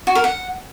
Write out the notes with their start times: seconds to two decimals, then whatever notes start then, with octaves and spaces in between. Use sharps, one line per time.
0.07 F#4
0.15 A#4
0.24 F#5